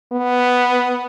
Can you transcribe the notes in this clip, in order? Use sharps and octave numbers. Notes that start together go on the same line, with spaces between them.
B3